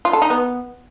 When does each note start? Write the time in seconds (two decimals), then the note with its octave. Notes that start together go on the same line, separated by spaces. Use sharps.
0.05 F4
0.13 A4
0.22 D#4
0.30 B3